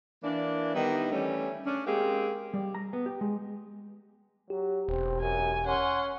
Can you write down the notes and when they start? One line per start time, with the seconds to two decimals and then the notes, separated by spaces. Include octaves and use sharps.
0.24 E3 A#3 D4
0.74 D#3 G3 B3 D#4 E4
1.11 E3 G3 A3 C#4
1.66 C#4 D4
1.86 G#3 A#3 C4 G4 G#4
2.54 G3
2.74 A#5
2.93 B3
3.06 G4
3.21 G#3
4.50 F#3 G4
4.88 E1 C4
5.22 F#2 G#5
5.66 C#4 F#5 C6